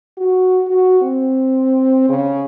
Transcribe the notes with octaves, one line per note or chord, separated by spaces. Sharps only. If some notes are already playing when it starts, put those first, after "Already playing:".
F#4
F#4
C4
C#3